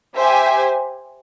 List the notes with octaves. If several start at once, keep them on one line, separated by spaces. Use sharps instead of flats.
G4 C5 E5 G#5